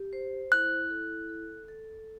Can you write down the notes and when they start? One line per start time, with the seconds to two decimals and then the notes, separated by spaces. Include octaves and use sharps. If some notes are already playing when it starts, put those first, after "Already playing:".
Already playing: G4
0.13 C5
0.52 E4 F#6
0.90 A4
1.29 A4
1.68 A4